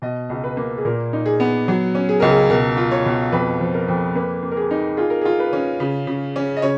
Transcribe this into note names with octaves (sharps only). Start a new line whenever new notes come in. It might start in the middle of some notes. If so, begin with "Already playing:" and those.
B2 D#5
C#2
B4
A#3
G#4
A#2 A#4
D#4
G#4
B3
F#3
C#4
G#4
C#2 A#4
G#4
B2 A#4
F4
C#5
B2
F2 B4
F3
A#4
F2
A#3 B4
A#3
A#4
G#4
D#4
F4 G#4
A#4
G#4
F4
B4
C#4
C#3
C#3
C#4
D#5
C#3 C#5